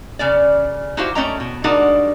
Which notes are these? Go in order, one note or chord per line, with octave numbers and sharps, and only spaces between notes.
C#3 C#4 D5
D#4 E4 F#4 G4 C5 F5
A3 C#4 A4 D#5 G5 A#5
B2
G3 G#3 D4 D#4 F#4 A#4